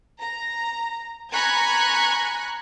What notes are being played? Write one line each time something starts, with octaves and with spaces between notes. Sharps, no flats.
A#5
G#5 A#5 B5 C#6 F#6 G#6